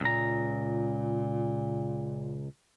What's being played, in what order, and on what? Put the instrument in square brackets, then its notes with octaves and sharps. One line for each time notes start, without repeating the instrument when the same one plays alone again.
[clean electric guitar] C#2 A#5 [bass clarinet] A#2